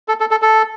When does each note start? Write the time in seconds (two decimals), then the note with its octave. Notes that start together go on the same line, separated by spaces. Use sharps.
0.08 A4
0.20 A4
0.31 A4
0.42 A4